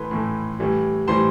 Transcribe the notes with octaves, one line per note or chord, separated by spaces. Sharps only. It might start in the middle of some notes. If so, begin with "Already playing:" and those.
Already playing: A2 E3 A3 B4 C6
A2 E3 A3
A2 E3 G3
A2 E3 G3 C5 C6